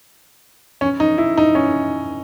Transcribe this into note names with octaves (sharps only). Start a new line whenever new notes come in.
C#4
D#4
E4
D#4
C#4